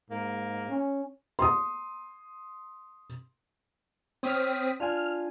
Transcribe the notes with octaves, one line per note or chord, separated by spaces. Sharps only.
G#2 A#3
C#4
C6 D#6
C4 C#5 D#6 F6 B6
D4 F4 G#5 F6